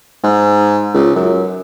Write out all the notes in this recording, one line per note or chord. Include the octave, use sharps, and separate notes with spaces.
G#2
C#2
F#2